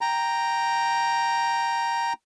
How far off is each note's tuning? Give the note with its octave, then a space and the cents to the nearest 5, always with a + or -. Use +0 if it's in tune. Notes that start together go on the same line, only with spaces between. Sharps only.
G5 +0 A#5 +0